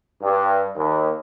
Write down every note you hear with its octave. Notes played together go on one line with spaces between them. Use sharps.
G2
D#2